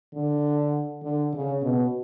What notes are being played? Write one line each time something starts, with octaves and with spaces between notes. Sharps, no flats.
D3
D3
C#3
B2